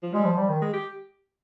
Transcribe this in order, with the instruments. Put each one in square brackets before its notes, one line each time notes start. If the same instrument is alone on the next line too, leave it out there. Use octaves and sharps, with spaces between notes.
[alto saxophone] F3
[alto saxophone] G3 [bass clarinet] G#3
[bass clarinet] F3
G3
D#3
[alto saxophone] G#3
G4